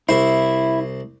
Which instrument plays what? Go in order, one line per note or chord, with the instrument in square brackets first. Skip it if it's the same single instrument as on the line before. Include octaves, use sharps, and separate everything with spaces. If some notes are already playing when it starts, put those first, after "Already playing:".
[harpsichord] C2 C5 [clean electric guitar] E4